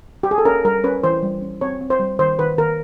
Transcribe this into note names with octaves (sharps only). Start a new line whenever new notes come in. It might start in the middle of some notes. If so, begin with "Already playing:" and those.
G4
G#4
A4
C#4 A#4
G3 A#4
C#4 B4
E3 C5
G3
C#4
C4 C#5
C4
C5
G3
D#3 C5
D#3 B4
D#3 A#4